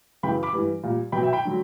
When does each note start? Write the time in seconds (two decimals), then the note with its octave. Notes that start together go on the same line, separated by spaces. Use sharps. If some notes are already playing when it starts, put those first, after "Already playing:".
0.23 F#2 C#3 E3 G5 B5
0.43 B5 D6
0.53 G2 E3 G3
0.83 A#2 G3
1.12 B2 F#3 G5 B5
1.23 E5 G5
1.33 G5 B5
1.45 D3 F#3